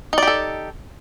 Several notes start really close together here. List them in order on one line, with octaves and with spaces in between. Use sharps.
D#4 D5 G4 A4